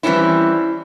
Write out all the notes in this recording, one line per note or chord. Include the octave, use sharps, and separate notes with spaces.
E3 G3 G#3 C4 C#4 E4